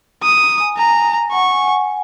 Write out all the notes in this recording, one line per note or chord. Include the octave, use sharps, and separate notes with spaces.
A#5 D#6
A#5
G#5
G#5 A#5
F#5 C#6
G#5